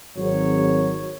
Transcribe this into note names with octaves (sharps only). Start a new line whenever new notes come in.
G#1 F#3 C#5